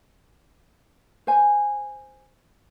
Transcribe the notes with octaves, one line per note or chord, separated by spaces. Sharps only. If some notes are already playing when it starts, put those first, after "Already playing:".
C5 G#5